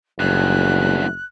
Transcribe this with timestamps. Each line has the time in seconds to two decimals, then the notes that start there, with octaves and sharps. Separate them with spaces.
0.19 F#1 E2 G2 F#6